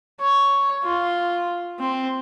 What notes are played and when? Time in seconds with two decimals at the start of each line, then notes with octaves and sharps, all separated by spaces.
0.20 C#5
0.84 F4
1.80 C4